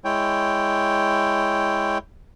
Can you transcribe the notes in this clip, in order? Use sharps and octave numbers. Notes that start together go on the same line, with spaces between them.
G#3 E4 C#5 G5